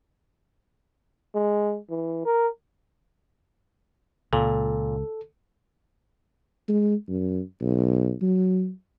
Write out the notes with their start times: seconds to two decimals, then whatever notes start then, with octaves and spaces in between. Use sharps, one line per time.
1.35 G#3
1.90 E3
2.25 A#4
4.33 C#2 A#2 A4
6.68 G#3
7.08 F#2
7.61 B1
8.22 F#3